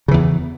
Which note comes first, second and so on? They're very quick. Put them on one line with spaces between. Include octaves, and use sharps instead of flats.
C#3 E3 E2